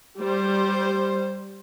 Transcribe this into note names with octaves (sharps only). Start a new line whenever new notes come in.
G3 C5